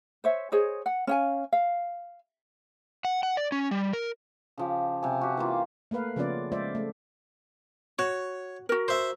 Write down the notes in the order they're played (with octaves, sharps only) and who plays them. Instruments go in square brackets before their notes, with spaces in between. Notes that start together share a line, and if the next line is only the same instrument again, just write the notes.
[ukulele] C5 C#5 E5
G#4 C5 C#5 D#5
F#5
C#4 F5 G#5
F5
[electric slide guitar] F#5
F#5
D5
C#4
G3
A#4
[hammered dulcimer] C#3 F3 G4
C3 G#5
F#4 G4
E3 A#3 F4
[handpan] A3 A#3 A#4 B4 F5
C#3 F3 B3 C#4 F4 D5
G#3 F4 C5 D5 E5
A3
[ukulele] F#4 [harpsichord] C#5
[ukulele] F#4 A#4
[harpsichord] C5 E5